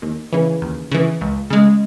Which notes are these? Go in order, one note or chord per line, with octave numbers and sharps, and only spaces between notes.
D#2
C#3 E3
D#2
C#3 E3
C#2
C#3 G#3